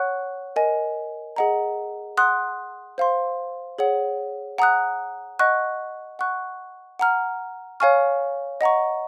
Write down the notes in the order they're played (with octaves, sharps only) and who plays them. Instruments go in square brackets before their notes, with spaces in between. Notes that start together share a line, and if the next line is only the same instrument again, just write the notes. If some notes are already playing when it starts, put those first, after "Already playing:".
Already playing: [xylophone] C#5 F#5 C#6 F#6
A#4 D#5 G#5
G#4 D#5 F#5 A#5
F#5 C6 D#6 F#6
C5 F5 C6
G#4 C#5 F#5
F#5 A#5 D#6 F#6
D#5 F#5 C#6 F#6
F#5 C#6 F#6
F#5 A#5 F6
C#5 F5 G#5 C#6 F6
D#5 F#5 A#5 C#6